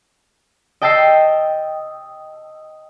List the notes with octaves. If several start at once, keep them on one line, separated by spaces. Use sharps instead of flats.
D#5 G5 A5 E6 C7